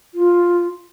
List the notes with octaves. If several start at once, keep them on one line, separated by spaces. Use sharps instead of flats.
F4